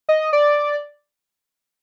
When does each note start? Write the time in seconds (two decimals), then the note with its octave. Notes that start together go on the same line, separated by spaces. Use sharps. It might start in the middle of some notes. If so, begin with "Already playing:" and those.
0.09 D#5
0.33 D5